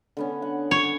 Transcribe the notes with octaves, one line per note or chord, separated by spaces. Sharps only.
D3 B3 C#4
F#5
C#5